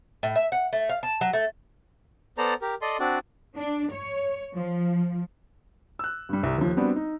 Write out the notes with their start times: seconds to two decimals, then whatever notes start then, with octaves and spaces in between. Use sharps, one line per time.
0.23 A2
0.36 E5
0.52 F#5
0.73 A3
0.89 F5
1.03 A5
1.21 F#3
1.33 A3
2.38 B3 A4 C5 D5 A#5
2.62 G4 A#4
2.82 A4 D5 D#5 C6
2.99 C4 D4 F#4 D5
3.57 D4
3.93 C#5
4.54 F3
5.99 E6 F#6
6.29 G2 G3
6.43 C2
6.58 D#2 F3
6.77 G3 B3 C4 D4 F#4
6.96 D#4